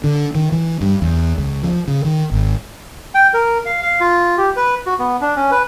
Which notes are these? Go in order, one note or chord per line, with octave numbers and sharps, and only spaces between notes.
D3
D#3
E3
G2
E2
C#2
F3
C#3
D#3
G#1
G5
A#4
F5
F5
F4
G4
B4
F#4
B3
D4
C#4
B4